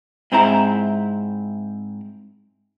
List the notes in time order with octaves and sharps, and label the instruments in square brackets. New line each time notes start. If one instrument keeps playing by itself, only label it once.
[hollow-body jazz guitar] G#2 C4 E4 A#5